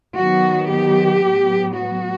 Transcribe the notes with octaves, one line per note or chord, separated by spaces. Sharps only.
D#3 F#3 B3 F#4
G4
A2 F#3 B3
F#4